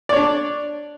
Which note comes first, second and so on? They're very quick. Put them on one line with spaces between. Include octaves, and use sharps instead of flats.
D5 C#5 D4